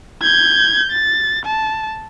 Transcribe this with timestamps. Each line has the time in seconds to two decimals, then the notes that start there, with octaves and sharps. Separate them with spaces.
0.22 G6 G#6
0.91 A6
1.45 A5